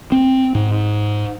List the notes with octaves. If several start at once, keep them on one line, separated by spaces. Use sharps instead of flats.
C4
G#2